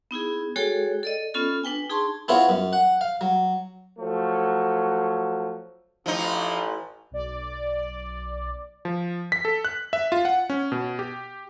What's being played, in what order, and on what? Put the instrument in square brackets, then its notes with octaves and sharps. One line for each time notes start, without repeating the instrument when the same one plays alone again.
[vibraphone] B3 D#4 E4 G#4
G#3 F#4 G#4 A4 C#5 G5
A4 D5 D#5
B3 C#4 F4 A4
D4 B4 G5 G#5
D#4 G#4 A5 C6 C#6
[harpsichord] B3 C4 E4 F4 G#4 C#5
F#2
F#5
F5
F#3
[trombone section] F3 F#3 A3
[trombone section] A1 [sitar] F3 D#4
[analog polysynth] B1 D5
[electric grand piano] F3
B6
A4
F#6
E5
F4
F#5
C#4
B2
G4